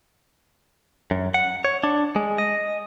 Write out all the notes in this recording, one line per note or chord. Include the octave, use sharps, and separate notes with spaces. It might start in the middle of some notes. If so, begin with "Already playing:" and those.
F#2
F#5
C#5
D4
G#3
D#5